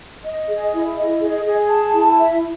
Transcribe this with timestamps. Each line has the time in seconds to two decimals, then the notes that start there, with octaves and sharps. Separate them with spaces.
0.24 D#5
0.48 G#4
0.73 E4
0.97 D#5
1.21 G#4
1.45 G#4
1.70 A5
1.94 E4
2.18 E5